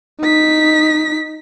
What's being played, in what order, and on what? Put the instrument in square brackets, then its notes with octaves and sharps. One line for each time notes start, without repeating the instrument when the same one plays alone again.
[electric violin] D#4 B6